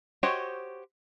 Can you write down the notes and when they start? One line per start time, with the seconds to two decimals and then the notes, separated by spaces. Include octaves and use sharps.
0.23 F#4 G4 C5 C#5 D#5